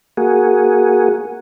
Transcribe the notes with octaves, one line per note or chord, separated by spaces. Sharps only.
A#3 F#4 G#4